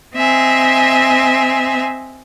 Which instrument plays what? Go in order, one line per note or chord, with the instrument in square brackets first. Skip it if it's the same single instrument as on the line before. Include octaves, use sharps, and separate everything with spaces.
[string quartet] C4 D#5 E5 G#5